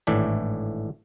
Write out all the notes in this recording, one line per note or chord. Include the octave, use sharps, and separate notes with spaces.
G#1 A2 E3 D4